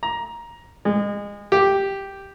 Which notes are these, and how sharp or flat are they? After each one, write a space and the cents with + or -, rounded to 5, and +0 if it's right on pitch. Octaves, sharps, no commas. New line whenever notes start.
A#5 +15
G#3 -30
G4 +0